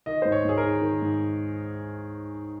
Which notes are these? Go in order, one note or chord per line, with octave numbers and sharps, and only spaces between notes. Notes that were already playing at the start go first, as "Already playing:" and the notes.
D#3 D#5
G#2 C5
C#5
G#2 G#4
A#4
D#3
D#3
G#2